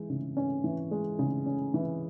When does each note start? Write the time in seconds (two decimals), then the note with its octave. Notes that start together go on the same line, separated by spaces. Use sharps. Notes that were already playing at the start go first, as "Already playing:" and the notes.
Already playing: E3 G#3
0.10 C#3
0.37 C#4
0.64 E3
0.91 G#3
1.19 C#3
1.46 C#4
1.74 E3